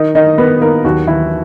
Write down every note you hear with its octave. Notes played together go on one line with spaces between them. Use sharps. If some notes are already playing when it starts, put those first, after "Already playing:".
Already playing: D#3 D#4 D#5
D#3 D#4 D#5
D#3 B3 B4
D#3 A#3 A#4
D#2 F#3 F#4
D#2 E3 E4